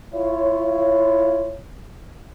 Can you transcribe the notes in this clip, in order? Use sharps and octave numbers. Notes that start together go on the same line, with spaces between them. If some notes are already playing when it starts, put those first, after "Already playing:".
E4 F4 C#5